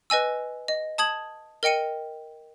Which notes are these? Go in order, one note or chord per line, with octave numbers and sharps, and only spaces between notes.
B4 D#5 G#5 E6
D#5
A5 D#6 G#6 F#7
A#4 D#5 G5 C#7 D#7